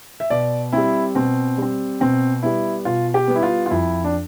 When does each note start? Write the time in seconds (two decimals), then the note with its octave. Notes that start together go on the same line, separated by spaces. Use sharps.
0.20 E5
0.30 B2 D5
0.72 G3 C4 E4
1.15 B2 C4
1.58 G3 C4
2.00 B2 C4
2.43 G3 B3 E4
2.85 B2 F4
3.14 G4
3.28 G3 B3
3.35 E4
3.43 F4
3.66 F4
3.70 F2 E4
4.04 D4